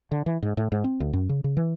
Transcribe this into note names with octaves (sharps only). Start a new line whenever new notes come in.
D3
E3
G#2
A2
G#2
C4
D2
F#2
C#3
C#3
E3